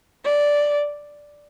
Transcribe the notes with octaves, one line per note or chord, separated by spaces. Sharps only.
D5